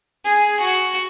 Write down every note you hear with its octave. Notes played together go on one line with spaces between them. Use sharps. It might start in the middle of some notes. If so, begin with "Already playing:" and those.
G#4
F#4